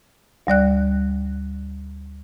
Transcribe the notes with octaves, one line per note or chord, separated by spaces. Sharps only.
D2 G3 D5 F#6